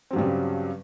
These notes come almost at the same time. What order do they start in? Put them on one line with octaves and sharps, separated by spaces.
C4 F#3 G2 G3 C#3